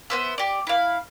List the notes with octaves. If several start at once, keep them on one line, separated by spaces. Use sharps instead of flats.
B3 C5 E5
G4 D5
E4 F5